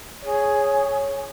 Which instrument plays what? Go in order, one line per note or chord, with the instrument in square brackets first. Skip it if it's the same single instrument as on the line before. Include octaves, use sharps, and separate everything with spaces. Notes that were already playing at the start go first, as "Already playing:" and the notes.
[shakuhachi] G#4 [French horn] C#5